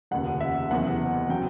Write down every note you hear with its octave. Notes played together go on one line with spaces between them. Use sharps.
F1 D#2 C#3 F#5
E5
F#1 E2 C3 F#5
C#3 F#3 G5